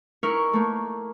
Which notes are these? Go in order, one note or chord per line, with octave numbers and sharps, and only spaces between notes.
D#4 E4 A#4 C#6 F6
A3 A#3